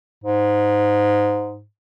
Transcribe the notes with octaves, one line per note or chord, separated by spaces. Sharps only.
G#2